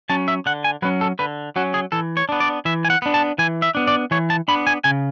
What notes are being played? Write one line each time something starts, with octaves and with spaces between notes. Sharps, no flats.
F#3 C#4 A5
E5
D3 F#5
G#5
F#3 C#4 B4
A4
D3 B4
F#3 C#4 F#4
G#4
E3 A4
C#5
B3 D4
D5
E3 E5
G#5
F#5
B3 D4
A5
E3 G#5
E5
B3 D4
D5
E3 C#5
A5
B3 D4 B5
G#5
C#3 G#5